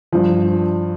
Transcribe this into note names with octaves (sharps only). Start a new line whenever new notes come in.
G2 F3